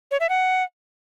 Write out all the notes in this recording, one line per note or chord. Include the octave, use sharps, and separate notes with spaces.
C#5
E5
F#5